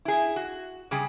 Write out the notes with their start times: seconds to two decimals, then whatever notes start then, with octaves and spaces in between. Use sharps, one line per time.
0.05 E4 G#4
0.36 F#4
0.91 C#3 G3 G#4